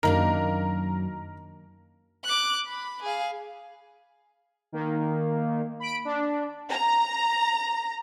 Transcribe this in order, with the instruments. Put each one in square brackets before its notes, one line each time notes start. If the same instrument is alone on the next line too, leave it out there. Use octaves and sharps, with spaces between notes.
[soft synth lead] F#2 [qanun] D#3 A#3 D4 [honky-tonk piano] A#4
[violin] D6 F#6
B5
G#4 F5
[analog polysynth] D#3 A#3
B5 D7
D4
[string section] A#5